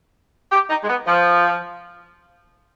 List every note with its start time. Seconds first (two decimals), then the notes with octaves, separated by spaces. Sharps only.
0.52 G4
0.70 D#4
0.84 G#3
0.88 B3
1.06 F3